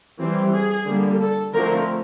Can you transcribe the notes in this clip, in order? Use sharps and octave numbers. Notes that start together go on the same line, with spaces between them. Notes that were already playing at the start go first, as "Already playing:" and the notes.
E3 G3 C4
G#4
D3 G3 A#3
A4
D3 F3 A3 C4 A#4